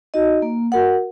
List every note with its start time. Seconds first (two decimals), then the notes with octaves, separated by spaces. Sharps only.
0.14 D#4 F#4 D#5
0.42 A#3
0.72 F#4 A#4 F#5